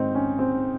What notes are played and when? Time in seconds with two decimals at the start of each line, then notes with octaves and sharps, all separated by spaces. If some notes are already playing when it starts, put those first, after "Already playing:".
Already playing: G#2 D#3 G#3 C4 D#4
0.15 C#4
0.39 C4